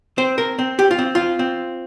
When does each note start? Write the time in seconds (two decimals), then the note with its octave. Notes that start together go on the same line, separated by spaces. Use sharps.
0.18 C4 C5
0.38 A#4
0.59 C4
0.79 G4
0.91 F4
0.99 C4
1.15 F4
1.39 C4